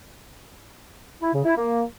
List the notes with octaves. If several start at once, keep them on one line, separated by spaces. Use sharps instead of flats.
E4
C#3
E4
A#3